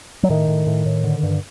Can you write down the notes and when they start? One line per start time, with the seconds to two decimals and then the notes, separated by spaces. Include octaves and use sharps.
0.23 F#3
0.29 A2 D#3
0.48 A2
0.67 A2
0.86 A2
1.04 D3
1.23 G2